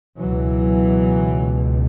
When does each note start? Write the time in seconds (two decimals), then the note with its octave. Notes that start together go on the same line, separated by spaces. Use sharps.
0.18 C#2 B2 E3 F#3